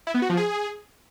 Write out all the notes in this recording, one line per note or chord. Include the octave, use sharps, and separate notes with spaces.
E4
B3
F#4
F3
G#4